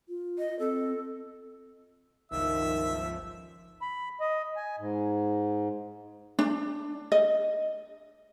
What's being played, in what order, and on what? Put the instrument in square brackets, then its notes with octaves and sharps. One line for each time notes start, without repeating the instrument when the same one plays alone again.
[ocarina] F4
[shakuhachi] D#5
[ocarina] C4 [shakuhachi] A4
[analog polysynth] G1 C#2 F3 [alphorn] D#3 [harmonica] E5 E6
[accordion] B5
D#5
G#5
G#2
[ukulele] D4
D#5